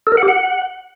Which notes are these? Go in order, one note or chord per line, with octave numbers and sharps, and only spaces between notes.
A4
A#4
F#5
G4
F#5